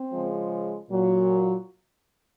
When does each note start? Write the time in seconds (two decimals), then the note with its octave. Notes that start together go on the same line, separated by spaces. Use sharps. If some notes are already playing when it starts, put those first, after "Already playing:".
Already playing: C4
0.13 C#3 F3 G#3
0.91 A#2 F#3